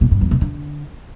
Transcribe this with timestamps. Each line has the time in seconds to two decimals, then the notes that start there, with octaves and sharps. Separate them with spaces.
0.01 B2
0.11 G2
0.21 E2
0.31 C3
0.41 D3